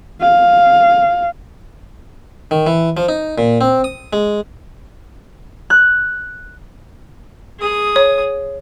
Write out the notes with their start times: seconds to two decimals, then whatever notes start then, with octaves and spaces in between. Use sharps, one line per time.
0.21 F5
2.51 D#3
2.67 E3
2.97 F3
3.09 D#4
3.38 A#2
3.61 C4
3.84 D#6
4.13 G#3
5.70 F#6
7.59 G#4 D#6
7.96 C#5